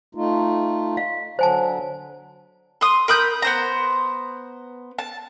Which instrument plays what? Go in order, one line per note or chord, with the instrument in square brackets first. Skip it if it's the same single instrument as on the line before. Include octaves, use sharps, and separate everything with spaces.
[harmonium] A3 D#4 F4
[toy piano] F5
[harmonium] D3 F#3 [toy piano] C5 G#5 A5
[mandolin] C6 D#6
A#4 B5 D#6 G6
B3 C5 A#5
A5